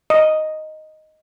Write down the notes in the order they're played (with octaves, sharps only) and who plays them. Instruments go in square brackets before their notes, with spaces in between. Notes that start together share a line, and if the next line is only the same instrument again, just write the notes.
[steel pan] D#5